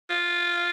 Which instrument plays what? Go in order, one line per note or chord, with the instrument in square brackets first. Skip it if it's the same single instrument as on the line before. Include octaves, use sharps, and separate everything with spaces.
[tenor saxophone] F4